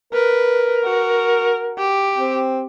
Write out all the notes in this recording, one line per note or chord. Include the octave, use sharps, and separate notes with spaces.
A#4 B4
F#4
G4
C4